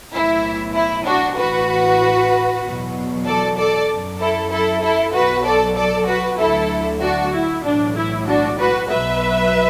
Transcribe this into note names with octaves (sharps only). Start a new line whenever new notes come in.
B1 A2 E3 E4
E4
D4 F#4
A1 A2 E3 F#4 B4
E2 B2 F#3
A4 D5
A4 D5
F#2 F#3
E4 A4
E4 A4
E4 A4
B1 B2 F#3 F#4 B4
A4 D5
A4 D5
F#4 B4
D2 D3 F#3 E4 A4
D4 F#4
E4
B1 A2 E3 D4
E4
D4 F#4
F#4 B4
B1 B2 F#3 B4 E5